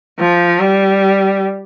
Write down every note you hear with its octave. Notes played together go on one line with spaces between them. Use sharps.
F3
G3